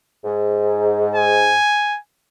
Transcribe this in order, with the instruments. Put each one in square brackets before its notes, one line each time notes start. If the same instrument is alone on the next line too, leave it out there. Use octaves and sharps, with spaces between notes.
[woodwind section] G#2
[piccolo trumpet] G#5